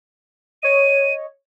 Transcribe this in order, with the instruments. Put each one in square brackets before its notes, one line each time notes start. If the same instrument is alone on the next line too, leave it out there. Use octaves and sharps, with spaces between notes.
[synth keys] C#5 D#5 [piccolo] D#7